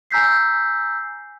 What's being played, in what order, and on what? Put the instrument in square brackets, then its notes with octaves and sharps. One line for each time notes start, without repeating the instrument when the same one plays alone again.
[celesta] G#5 A#5 E6 G6 B6 C7